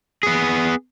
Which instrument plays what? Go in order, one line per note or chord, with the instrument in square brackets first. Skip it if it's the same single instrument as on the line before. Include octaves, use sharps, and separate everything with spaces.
[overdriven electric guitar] B3 G#4